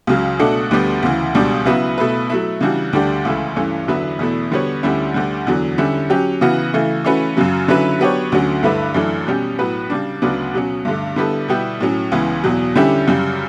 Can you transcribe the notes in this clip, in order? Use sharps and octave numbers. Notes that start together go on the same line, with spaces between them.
C#2 C#3 F#3
B2 A3 D4 F#4 A4
D2 D3 G3 B3
D2 C#3 E3
C#2 B2 G3 D4
C#3 F#3 B3 E4
B2 A3 E4 B4
F#3 A3 E4
C#3 E3 G3 D4 F#4
D2 D3 G3 D4 G4
C#2 C#3 E3 A3 E4
G2 E3 A3 C#4
E2 D3 F#3 B3 E4
E2 B2 A3 E4
D3 G3 B3 F#4 C#5
D2 D3 G3 C#4 E4
D2 D3 G3
E2 D3 F#3
D3 G3 C#4 E4
F#3 C#4 G4
C#3 E3 B3 F#4
C#3 E3 A3
E3 A3 C#4 F#4 B4
F#2 C#3 F#3
D3 F#3 C#4 E4 B4
F#3 B3 D4 G4 C#5
D2 D3 F#3 C#4
G2 D3 A3 E4 B4
F#2 E3 A3 D4
B2 G3 C#4 G4
A2 F#3 B3 F#4 B4
C#3 G3 D4
D2 C#3 F#3 B3 D4
B2 F#3 C#4
G2 D3 A3
D3 G3 B3 E4 A4
B2 G3 B3 E4 G4
A2 F#3 C#4
C#2 C#3 E3 B3
E2 B2 F#3
D3 G3 C#4 E4 G4
F#2 C#3 G3